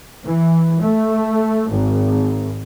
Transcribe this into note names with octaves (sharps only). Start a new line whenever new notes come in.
E3
A3
G#1